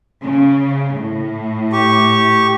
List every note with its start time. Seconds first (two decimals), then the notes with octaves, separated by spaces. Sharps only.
0.23 C#3
0.97 A2
1.73 G4 C#6